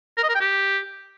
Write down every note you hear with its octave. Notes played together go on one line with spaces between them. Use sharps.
A#4
D#5
A#4
G5
G4